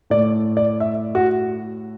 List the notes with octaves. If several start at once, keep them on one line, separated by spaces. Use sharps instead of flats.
A2 A3 D5
D5
E5
F#4